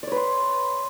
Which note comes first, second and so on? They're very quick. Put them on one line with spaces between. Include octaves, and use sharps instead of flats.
D5 C#5 B4 C6